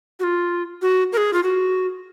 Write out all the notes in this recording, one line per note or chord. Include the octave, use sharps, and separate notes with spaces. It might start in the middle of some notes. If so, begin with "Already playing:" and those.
F#4
F4
F#4
A#4
G#4
F4
F#4